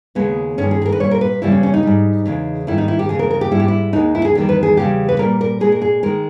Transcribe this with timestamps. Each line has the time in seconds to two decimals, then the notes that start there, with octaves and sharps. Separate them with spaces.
0.15 D#2 C#3 G#3 B3
0.58 G2 D#3 G#3 C#4
0.71 G#4
0.82 G#4
0.86 A#4
0.92 B4
1.00 A#2 G3 C#5
1.11 A#4
1.21 B4
1.42 E2 C#3 G3 E4
1.52 C#4
1.63 C#4
1.74 D#4
1.83 G#2 G3
2.26 E2 C#3 G#3
2.67 G#2 D#3 G3 E4
2.78 D#4
2.88 E4
2.99 G4
3.09 E2 C#3 G#3 G#4
3.19 A#4
3.31 A#4
3.41 G4
3.51 G#2 G3 E4
3.60 G4
3.68 E4
3.93 D#2 D#3 G#3 D#4
4.15 E4
4.25 G#4
4.35 E2 D#3 G3 G4
4.49 B4
4.63 G#4
4.77 E2 C#3 G3 G4
5.09 B4
5.19 A#2 G3 A#4
5.41 A#4
5.61 A#2 G#3 G#4
5.72 A#4
5.82 G#4
6.03 D#3 G#3 A#4